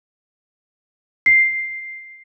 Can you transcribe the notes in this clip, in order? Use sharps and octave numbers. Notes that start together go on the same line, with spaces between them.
C7